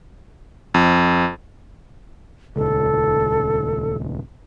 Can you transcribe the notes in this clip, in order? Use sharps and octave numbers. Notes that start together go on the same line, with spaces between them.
F2
D#1 C#2 A4